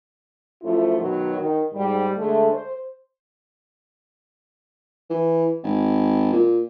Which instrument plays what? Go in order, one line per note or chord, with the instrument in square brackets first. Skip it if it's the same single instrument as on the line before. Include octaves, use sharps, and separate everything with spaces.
[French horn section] F#2 F3 A3 E4 F4
B2 D#3 F#3
D#3
G#2 G3
D3 G#3 A3
C5
[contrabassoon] E3
G#1
A#2